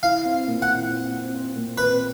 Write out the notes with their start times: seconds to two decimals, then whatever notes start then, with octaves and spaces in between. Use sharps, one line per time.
0.03 E4 F5
0.25 C4
0.48 A#2
0.62 F#5
0.68 E4
0.91 C4
1.12 C4
1.35 C4
1.56 A#2
1.78 C4 B4